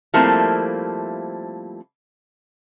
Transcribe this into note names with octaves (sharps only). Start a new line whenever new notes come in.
F3 G3 A3 A#3 C4 E4